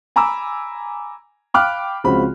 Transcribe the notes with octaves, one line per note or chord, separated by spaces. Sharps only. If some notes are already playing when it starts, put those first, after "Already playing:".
G#5 A#5 B5 D6 E6
F5 G5 B5 D6 F6 F#6
C#2 C#3 F3 C4 F#4 B5